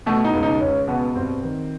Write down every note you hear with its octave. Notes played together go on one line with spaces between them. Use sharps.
B2 A3
D#4
C#2
D#4
C#2 C#4
B2 B3
G2 C4
D#3